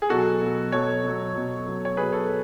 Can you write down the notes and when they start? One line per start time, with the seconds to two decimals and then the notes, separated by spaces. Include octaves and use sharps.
0.02 G#4
0.09 B2 F#3 F#4 A4
0.41 B2 F#3
0.72 B2 F#3 A4 C#5
1.04 B2 F#3
1.35 B2 F#3
1.66 B2 F#3
1.85 C#5
1.97 B2 F#3 G#4 B4
2.12 A4 C#5
2.28 F#3